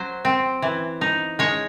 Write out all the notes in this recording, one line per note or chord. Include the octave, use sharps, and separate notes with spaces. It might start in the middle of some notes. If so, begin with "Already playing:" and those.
Already playing: F#3 C5
C4
E3
D#4
G#3 C#5